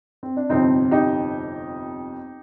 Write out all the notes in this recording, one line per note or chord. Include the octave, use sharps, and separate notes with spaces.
C4
D4
G1 F2 C3 C4 D#4
D#4 G4